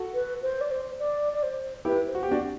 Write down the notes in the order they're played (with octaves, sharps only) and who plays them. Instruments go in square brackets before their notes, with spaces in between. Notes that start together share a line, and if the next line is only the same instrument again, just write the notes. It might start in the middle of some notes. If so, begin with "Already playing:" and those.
Already playing: [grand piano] F#4 A4
[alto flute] B4
C5
D5
C5
D5
D5
C5
[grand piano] E4 G4 [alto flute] B4
[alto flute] C5
[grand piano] F#4
G4
[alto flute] B3 [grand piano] D4 F#4
[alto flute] C4